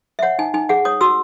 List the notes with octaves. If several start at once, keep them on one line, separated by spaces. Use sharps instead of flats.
E5
C#5 F#5
D#4 G#5
D#4 G#5
G#4 F#5
C#5 D#6
F#4 E6